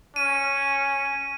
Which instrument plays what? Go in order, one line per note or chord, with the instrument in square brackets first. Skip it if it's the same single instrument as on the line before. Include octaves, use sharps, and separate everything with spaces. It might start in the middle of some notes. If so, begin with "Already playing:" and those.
[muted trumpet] C#4 [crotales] D#7